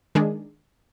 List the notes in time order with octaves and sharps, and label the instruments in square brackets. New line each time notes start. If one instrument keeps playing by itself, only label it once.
[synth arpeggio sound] D#3 G#3 D4 G#4